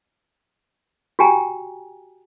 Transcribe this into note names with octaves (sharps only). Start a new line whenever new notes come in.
F#4 G4 G5 G#5 A#5